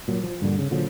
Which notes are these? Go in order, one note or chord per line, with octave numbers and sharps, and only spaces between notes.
A#2 F#3
F3
D2 G2 A#2 D3
C#3
A#2 D3 F3 F#3